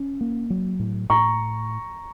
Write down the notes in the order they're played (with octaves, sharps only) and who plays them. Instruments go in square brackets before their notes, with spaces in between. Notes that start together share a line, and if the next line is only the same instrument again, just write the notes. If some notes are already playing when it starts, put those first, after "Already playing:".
Already playing: [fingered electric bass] C#4
A#3
F#3
A2
[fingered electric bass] A2 [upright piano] A#5 C#6